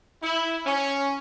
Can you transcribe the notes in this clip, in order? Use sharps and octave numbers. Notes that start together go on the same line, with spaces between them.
E4
C#4